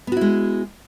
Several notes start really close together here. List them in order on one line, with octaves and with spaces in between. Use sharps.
B3 F#4 E4 G#3